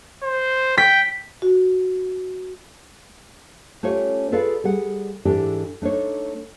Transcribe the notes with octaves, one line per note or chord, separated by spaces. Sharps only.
C5
G5 B6
F#4
A3 C#4 F4 G4 C#5
F4 G#4 A4 B4 D5 F5
G3 G#4 F#5
G#2 E3 D4 G4 A4 D5
A3 D4 D#4 C#5